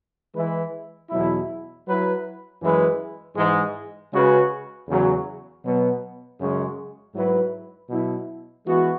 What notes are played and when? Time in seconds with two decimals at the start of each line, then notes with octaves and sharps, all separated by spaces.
0.36 E3 G#3 E4 B4
1.10 E2 B2 F#3 E4
1.87 F#3 E4 B4
2.62 F#2 E3 G#3 E4 B4
3.37 G#2 E3 G#3
4.13 C#3 G#3 C#4 F#4 B4
4.88 E2 C#3 F#3
5.64 B2 F#3 B3
6.39 F#2 C#3 G#3 C#4
7.15 G#2 F#3 E4 B4
7.89 B2 F#3 E4
8.65 E3 G#3 B3 F#4